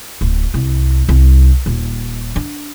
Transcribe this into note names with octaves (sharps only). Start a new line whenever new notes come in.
D1
C2
C2
D#1
D4